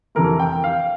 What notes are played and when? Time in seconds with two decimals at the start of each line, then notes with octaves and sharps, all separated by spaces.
0.15 F2 C3 E3 A3 A#4
0.40 G5
0.64 F5